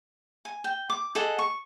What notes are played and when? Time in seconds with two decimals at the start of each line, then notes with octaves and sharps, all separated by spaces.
0.45 G#5
0.64 G5
0.90 D6
1.15 G#4 A4 D#5 F#5
1.39 C#6